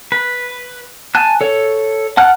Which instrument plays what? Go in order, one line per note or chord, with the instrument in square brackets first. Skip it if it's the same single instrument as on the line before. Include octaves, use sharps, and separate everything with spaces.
[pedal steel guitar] B4
G#5 A5 F#6
A4 C#5
F#5 A5 F6 F#6